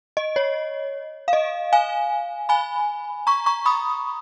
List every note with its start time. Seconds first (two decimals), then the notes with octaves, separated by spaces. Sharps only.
0.17 D#5
0.36 C#5
1.28 F5
1.33 D#5
1.73 F5 G#5
2.49 G#5 B5
3.27 A#5 C#6
3.46 A#5 C#6
3.66 B5 D#6